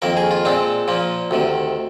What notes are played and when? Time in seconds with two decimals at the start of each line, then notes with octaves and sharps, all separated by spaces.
0.02 F2 D#3 A#3 A#4
0.17 G#4
0.31 F4
0.45 A#2 G#3 C4 D4
0.88 A#2 F3 A#3
1.31 D2 C3 D#3